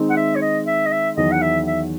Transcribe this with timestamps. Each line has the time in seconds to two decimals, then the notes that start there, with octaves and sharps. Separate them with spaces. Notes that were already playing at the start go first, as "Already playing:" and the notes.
Already playing: D#3 G#3 C4 D#4
0.10 F#5
0.17 E5
0.36 C#5
0.42 D#5
0.66 E5
0.86 D#5
0.92 E5
1.17 E2 D#3 F#3 D#5
1.32 F#5
1.42 E5
1.67 E5